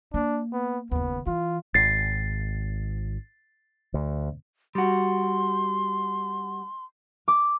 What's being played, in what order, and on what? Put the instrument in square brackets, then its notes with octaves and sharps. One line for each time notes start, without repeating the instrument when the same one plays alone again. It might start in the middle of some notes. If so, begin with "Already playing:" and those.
[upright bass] A#3 [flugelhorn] D4
[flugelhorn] B3
[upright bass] F#1 D#2 [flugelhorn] B3
[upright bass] E3 [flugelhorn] F4
[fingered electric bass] G#1 [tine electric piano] A6 C7
[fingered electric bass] D2
[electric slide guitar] G3 F#4 [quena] C6
[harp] D6